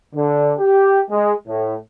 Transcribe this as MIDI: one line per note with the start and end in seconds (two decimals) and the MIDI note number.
0.15 0.53 50
0.59 1.01 67
1.10 1.34 56
1.48 1.75 45